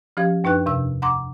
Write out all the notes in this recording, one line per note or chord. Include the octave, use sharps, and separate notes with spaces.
F3 C#4 G4 F5 G#6
F#2 D4 D#4 B4 G5 F#6
E2 C3 E6
F#5 A#5 C6 D6